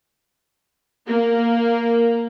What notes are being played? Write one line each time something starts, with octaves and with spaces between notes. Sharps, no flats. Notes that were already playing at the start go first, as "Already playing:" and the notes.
A#3